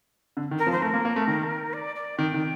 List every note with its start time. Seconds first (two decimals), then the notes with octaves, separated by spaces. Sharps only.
0.37 D3
0.51 D#3
0.59 A#4
0.67 F3
0.72 C5
0.82 A3 A#4
0.94 A#3
1.05 A#3
1.16 A3
1.28 D#3
1.73 D5
1.96 D5
2.18 D#3 G5
2.34 D#3